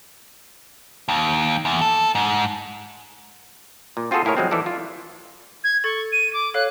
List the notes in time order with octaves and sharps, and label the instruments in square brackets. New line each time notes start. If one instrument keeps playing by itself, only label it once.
[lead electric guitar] D#2
E2
A4
G#2
[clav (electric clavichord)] A#2
C4 F4 F#4 G#4 A4 C5
A2 E4 G#4 A#4 C#5
F3 F#3 G#3 B3 C4
E3 F3 A4 D5
F4
[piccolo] G#6
[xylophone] A4 A6 [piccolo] C#6
[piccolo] D#7
D6
[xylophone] A4 C#5 F5 [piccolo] F#6